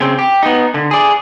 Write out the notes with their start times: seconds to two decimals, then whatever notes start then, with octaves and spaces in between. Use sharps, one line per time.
0.01 C#3 C4
0.19 G4
0.43 B3 D#4
0.74 D3
0.91 G#4 D5